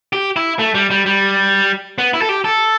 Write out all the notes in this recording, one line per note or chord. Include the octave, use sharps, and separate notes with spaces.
G4
E4
A3
G3
G3
G3
B3
E4
A4
G4
A4